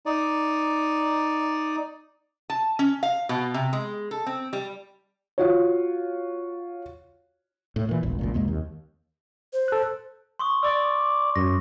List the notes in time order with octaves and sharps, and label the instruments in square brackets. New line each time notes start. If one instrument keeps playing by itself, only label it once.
[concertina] D#4 D5
[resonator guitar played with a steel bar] A5
C#4
F5
B2
C3
G#3
A4
C4
G3
[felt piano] F4 F#4 C#5
[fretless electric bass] A2
A#2 E3
E1 A#1
G#1 C#2 A#2
C2 F2 G#3 A#3
D#2
[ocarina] C5
[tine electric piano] A4 F#6
[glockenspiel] C6 C#6 D#6
[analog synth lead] D5 [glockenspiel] C6 D6 E6
[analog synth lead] F#2 [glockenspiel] A#6